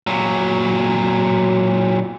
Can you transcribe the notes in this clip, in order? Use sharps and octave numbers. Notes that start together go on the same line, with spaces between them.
A#2 F#3